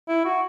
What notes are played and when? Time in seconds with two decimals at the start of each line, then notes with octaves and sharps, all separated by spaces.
0.08 E4
0.25 F#4